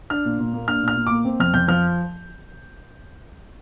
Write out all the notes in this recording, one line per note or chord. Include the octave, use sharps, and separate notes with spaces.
D4 F6
A#2
A#2
A#3
D4 F6
A#2
F6
A#2
A#3 D6
C4
F2 F6
F2 G6
F3 F6